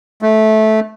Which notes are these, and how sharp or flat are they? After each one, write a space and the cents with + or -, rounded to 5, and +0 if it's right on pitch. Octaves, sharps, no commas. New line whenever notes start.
A3 -15